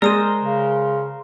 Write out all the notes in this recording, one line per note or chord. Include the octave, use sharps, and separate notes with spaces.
G#3 A#4 C5 D5 D#6 D#7
C#3